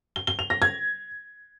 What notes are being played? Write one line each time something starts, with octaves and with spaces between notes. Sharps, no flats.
G7
G7
F7
A#6
G#6